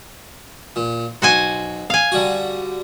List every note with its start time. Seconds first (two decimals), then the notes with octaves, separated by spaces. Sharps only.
0.76 A#2
1.22 B1 F#4 C5 G#5
1.90 F5 G#5
2.12 D3 G3 F#4